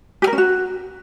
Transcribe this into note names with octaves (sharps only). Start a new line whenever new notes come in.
G4
A#4
C#4
F#4